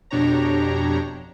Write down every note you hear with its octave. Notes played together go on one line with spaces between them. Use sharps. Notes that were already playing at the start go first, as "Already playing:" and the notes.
F2 B2 D4 G4 C#5 A#5